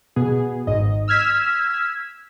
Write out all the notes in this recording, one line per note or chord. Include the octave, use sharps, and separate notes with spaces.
B2 B3 G#4
G#1 G#2 D#5
E6 F6 G#6 B6 E7